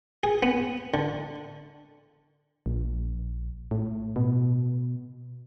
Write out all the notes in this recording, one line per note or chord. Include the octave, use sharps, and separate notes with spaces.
G#4
B3
D3
A#1
A2
B2